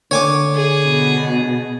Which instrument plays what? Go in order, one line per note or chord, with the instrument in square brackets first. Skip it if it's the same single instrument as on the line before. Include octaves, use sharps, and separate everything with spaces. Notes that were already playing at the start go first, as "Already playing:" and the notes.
[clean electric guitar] D3 [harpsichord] C#5 G#5 D6
[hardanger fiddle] G#4
[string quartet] B2